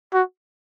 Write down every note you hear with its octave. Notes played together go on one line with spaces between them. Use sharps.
F#4